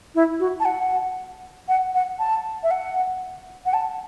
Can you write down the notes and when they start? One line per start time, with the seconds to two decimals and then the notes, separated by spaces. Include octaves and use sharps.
0.15 E4
0.40 F#4
0.60 A5
0.65 F#5
1.68 F#5
1.94 F#5
2.19 A5
2.63 E5
2.71 F#5
3.65 F#5
3.74 A5